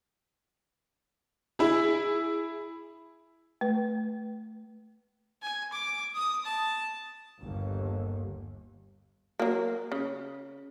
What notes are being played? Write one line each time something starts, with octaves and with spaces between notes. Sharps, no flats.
E4 G#4
A3 B4
G#5
D6
D#6
A5
G1 D#2
F#3 A#3
C#3